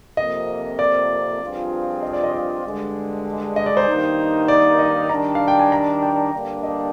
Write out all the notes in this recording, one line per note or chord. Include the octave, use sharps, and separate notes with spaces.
F2 C3 F3 A#3 D#5
D5
G2 F3 C4 F4 G#4
D#5
D5
D#5
D5
G2 D3 G#3
D#5
D5
C5
G2 D#3 A#3 D#4
D5
D#5
D#3 G3 D4 A#5
F5
G5
G#5
A#5
G5
G2 D3 G3 A#3 D4
D#5